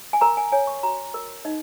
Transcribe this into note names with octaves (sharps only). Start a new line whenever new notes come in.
G#5
A#4 A#5
G#5
C#5 G#5
C#6
F#4 A#5
A#4
D#4 D#5